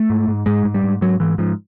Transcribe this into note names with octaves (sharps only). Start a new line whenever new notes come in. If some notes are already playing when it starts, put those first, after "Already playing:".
Already playing: A3
G#2
G#2
G#2 G#3
G#2
G3
G#2
G#2 F#3
G#2 E3
G#2 F3